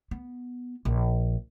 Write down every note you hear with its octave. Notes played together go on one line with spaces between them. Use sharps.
B3
A#1